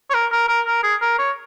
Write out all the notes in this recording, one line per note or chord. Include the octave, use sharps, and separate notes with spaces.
C#5
A#4
A#4
A#4
A#4
G#4
A#4
C#5